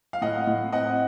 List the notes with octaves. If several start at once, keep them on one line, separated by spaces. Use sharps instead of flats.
F5
A2 D#5 F#5
A2
C4 D#5 F#5